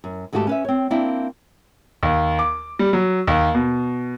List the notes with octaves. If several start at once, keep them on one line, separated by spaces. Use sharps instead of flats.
F#2
D#2 G#2 A3 F#4 G4 A5
C#4 B4 E5
C4 C#5
A#3 C4 D4 E4 D5 E5
D#2
D6
G3
F#3
D#2
B2